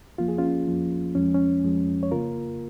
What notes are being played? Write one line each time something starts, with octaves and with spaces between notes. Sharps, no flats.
F2 F3 A#3 F4
G#4
C#4 F4
F2 F3 A#3
F2 F3 G#3 C#4
C#4
F2 F3 G#3
C#5
C#3 A#3 F4 A#4